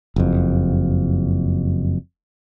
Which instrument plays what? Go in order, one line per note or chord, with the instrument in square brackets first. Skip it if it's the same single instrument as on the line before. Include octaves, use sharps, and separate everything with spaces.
[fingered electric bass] F#1 F2